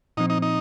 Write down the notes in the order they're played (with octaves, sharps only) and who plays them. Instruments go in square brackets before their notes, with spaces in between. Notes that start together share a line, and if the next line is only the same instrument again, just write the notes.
[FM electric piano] A#2 F3 C4 [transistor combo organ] D#4
[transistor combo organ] D#4
D#4